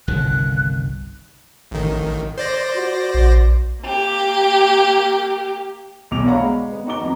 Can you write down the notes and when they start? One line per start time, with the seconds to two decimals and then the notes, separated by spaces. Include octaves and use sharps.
0.08 G1 C2 D#3 F#6
1.71 A1 D#3
2.38 C5 D5 A#6
2.76 F#4
3.14 A#1
3.81 A#3 G4
6.11 B1 E2 B2 D6 F7
6.25 C#5 D5 F5 F#5 A#5 B5
6.37 G#3
6.72 B3
6.87 D#4 F#4 A#5 D6 G7
7.01 F2 A#5